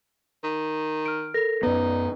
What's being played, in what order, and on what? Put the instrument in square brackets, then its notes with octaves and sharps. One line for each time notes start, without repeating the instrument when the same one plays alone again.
[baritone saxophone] D#3
[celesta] F6 D7
A4 A#4 A#6
[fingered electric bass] F#2 B3 [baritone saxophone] D#4 [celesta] B4 D5